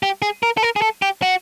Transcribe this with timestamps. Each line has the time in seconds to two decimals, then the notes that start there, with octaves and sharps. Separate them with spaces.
0.03 G4
0.22 G#4
0.43 A#4
0.57 A4
0.63 A#4
0.76 G#4
0.82 A4
1.02 G4
1.22 F#4